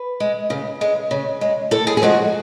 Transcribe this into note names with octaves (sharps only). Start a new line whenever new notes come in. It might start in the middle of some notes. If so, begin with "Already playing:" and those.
Already playing: B4
G#3
C#3
G#3
C#3
G#3
A2 A4
G#4
G#4
F3 G#3 F#4